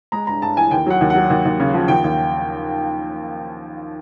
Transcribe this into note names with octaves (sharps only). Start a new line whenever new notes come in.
G#3 A#5
G2 A#5
G2 A5
E3 G#5
D#2 G5
F#3 F#5
D#2
F#3 F#5
D#2
D#2
C#3
F3
D#2 G5
D#2